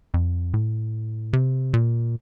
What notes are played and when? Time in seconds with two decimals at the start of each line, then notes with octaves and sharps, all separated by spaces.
0.14 F2
0.54 A2
1.33 C3
1.74 A#2